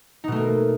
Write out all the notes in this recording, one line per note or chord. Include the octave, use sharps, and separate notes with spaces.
B2 A3 A#3 D#4